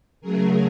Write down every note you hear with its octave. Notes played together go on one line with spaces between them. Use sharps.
C#3 F#3 A3 G#4 A#4